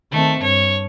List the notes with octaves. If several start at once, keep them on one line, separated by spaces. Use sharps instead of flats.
D#3 A3 C4
G2 C#5